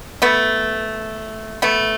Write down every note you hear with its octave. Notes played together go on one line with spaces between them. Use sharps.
A3 B3
A3 B3